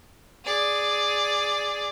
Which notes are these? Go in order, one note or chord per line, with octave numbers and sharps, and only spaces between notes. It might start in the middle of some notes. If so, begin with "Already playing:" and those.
G#4 D5